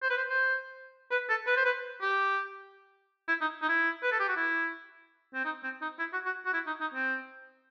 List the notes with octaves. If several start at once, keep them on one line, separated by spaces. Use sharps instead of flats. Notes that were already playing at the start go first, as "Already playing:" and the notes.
C5
B4
C5
C5
B4
A4
B4
C5
B4
G4
E4
D#4
D#4
E4
B4
A4
G4
F#4
E4
C4
D#4
C4
D#4
E4
F#4
F#4
F#4
E4
D#4
D#4
C4